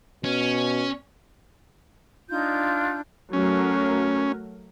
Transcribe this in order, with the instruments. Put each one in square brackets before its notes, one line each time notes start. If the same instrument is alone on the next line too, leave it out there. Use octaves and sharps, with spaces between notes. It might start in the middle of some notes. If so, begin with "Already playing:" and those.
[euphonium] B2 [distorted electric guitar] C#4
[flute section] D4 D#4 F4 G6
[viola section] F#3 A3 A#4 [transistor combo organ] C#4